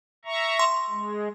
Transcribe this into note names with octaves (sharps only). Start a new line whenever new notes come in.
E5 A#5 C#6
C6
G#3